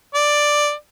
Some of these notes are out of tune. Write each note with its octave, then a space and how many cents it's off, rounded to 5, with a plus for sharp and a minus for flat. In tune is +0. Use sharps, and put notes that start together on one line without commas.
D5 +5